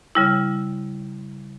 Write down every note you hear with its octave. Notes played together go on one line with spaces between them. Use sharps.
C#3 G3 E4